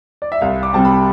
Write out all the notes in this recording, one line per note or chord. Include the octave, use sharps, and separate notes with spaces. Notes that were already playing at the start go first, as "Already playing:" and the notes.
D5
E5
C2 F5
D6
C3 G3 C4 A5
B5